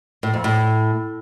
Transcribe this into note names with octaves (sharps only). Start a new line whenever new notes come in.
A2
F2
A2